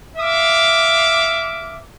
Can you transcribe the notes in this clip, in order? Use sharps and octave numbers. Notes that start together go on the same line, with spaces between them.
E5 F5 D6